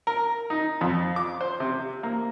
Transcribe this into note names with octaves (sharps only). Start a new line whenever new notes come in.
A#4
D#4
F2
D6
C5
C3
A#3